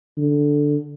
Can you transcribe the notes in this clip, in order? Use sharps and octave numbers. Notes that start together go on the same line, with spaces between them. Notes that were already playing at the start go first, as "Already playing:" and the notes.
D3